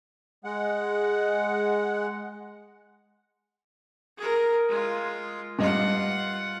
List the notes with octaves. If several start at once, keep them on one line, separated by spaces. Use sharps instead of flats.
G#3 F#5
G#4 A#4
G#3 F4
G2 F4 D#5 F#5